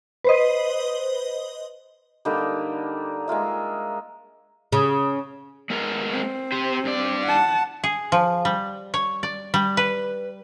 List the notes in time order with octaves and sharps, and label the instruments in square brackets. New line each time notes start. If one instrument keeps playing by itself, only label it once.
[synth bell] B4 C5 D#5
[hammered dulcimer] D3 G3 A#3 D#4
G#3 A#3 F4 E5
[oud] C#3
[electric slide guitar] G#3 B3 A#4
[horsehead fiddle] C4
[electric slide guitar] G4 C5
G2 D5
[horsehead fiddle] F#5 A5
[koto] G#4
F3
G3
C#5
D5
G3
B4